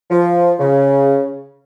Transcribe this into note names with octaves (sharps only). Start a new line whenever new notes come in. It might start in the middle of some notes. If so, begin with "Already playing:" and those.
F3
C#3